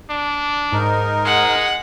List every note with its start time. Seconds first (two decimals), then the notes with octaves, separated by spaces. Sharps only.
0.10 D4
0.73 G#2 D#4 A#4
1.25 G#3 F#5